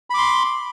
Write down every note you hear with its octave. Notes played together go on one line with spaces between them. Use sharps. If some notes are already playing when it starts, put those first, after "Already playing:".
B5 C6 D6